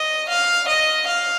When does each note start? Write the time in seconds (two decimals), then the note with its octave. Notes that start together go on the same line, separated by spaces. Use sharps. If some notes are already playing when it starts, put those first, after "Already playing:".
Already playing: D#5
0.29 F5
0.68 D#5
1.07 F5